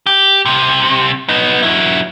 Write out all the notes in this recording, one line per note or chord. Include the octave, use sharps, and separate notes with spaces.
G4
C2 C3
B3 D#4
F#3 E4